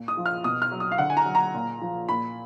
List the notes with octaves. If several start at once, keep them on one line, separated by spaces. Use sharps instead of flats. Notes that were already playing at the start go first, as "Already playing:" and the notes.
Already playing: A#2
D#6
F3
F6
B2 D#6
F6
F#3
D#6
F5
D3 F#5
G#5
A#5
F#3
A#5
A#2
F3
A#2 B5